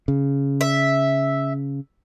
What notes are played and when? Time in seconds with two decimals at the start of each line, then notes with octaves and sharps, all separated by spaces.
0.08 C#3
0.61 E5